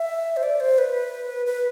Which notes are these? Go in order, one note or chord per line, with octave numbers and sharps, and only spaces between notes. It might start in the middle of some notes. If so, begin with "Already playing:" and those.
Already playing: E5
C5
D5
C5
B4
B4